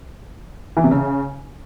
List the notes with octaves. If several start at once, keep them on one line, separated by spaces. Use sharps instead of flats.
E3
C3
C#3